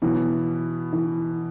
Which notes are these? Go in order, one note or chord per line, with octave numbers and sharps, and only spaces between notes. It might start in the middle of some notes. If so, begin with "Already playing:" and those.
B2 E3 F#3 B3
E3